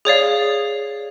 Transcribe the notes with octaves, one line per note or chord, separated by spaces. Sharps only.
G#4 C#5 D5 F5